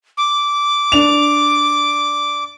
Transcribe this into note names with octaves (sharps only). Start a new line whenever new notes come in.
D6
D4 F7